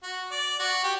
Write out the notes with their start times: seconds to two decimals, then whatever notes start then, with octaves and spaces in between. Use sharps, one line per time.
0.03 F#4
0.31 D5
0.59 F#4
0.84 G4